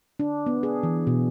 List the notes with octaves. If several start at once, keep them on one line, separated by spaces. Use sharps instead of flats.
D4
B3
G#4
E3
B2